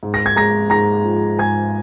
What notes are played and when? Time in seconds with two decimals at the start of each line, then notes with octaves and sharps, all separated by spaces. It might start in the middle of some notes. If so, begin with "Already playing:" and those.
0.03 G#2
0.14 A#6
0.26 G#6
0.36 G#3 A#5 A#6
0.70 G#2 A#5 A#6
1.04 F3
1.39 G#2 G#5 G#6